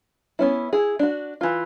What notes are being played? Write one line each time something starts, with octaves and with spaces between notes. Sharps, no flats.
B3 C#4 E4
E4 G#4
D4 F#4
E3 F4